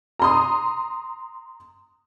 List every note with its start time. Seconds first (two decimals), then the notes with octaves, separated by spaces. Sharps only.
0.19 A#5 C6 D#6